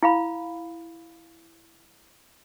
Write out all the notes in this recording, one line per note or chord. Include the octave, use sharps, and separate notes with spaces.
E4 F5 B5